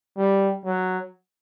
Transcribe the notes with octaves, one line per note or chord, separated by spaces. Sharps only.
G3
F#3